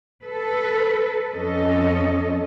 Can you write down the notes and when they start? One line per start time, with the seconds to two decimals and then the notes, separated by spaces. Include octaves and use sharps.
0.24 A4 B4
1.33 F2 C#4 A4 D#5